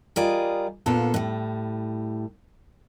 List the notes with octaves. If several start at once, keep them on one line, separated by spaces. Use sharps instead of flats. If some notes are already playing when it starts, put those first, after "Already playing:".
G3 F4 G#4 A#4 D5 D#5
A#2 D3 B3 F4 A4
A2 G3